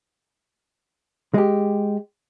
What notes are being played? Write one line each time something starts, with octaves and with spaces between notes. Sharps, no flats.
G#3 G4